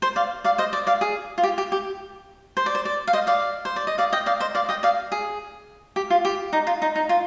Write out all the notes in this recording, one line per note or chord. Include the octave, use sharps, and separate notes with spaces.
C5
D5 F5
D5 F5
C5 D#5
D5
D5 F5
G#4
F4
G4
G4
G4
C5
D5
C5
D5
F5
C5 D#5
D5 F5
C5
D5
D#5
D5 F5
D#5 G5
D5 F5
C5 D#5
D5 F5
D#5 G5
D5 F5
G#4
G4
F4
G4
D#4
F4
D#4
D#4
F4